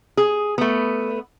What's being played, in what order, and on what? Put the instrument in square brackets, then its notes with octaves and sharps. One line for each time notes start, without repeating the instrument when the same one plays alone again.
[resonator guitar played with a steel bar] G#4
A3 B3